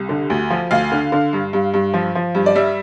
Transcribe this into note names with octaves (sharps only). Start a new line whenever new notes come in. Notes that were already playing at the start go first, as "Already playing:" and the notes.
Already playing: C2
D3
D2
F3
D2 F5
D3
D3
G2
G2
G2
F3
F3
G2
D5
G3 E5